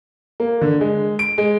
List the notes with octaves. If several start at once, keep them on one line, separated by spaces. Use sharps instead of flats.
A#3
D3
G#3
D7
G#3